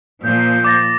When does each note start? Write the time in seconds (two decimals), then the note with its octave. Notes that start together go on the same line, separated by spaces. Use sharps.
0.24 A#2 F3 A#3 G6
0.64 D6 A6 A#6